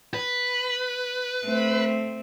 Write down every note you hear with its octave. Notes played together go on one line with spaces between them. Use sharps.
B4
A3 C4